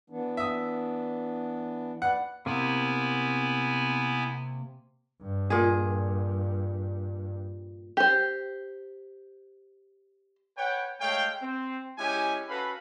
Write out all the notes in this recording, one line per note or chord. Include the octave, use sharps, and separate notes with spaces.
E3 B3 D4
E5 D#6
B4 D5 F#5
C3 A#3 B3 E4 G#5
G2
A#2 G#4
G4 C5
B4 C#5 F#5 G5
G#3 A3 C#5 F5 G5
C4
G#3 C#4 E4 G4 G#5
C#4 F#4 A4 B4 F5 B5